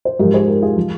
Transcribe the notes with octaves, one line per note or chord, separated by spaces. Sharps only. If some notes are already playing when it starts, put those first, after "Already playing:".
C5
G#2 F3 G4 A#4
G#4 C5
G4 A#4
F4 G#4
F3